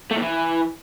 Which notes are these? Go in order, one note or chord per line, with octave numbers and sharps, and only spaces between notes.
A3
A#2
E3